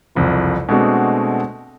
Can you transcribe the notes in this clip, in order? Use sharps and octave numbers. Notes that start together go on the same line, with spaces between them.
F#1 C2 F2
B2 G#3 A3 C4 D4 F#4